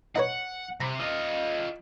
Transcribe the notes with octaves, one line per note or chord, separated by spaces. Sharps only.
D#4 B4 C#5 F#5
C3 A#5 B5
F4 D#5